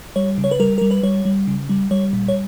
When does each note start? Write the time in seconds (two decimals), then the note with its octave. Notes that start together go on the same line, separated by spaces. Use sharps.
0.16 G3 C#5
0.38 C#3
0.44 C#5
0.51 B4
0.60 G3 A#4
0.78 G3 A#4
0.91 B4
1.03 G3 C#5
1.25 G3
1.48 C#3
1.69 G3
1.91 G3 C#5
2.13 A#2
2.28 C#5